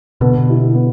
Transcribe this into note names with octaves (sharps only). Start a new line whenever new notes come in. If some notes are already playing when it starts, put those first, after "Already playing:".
B2 D3 B3
E4 G4
B3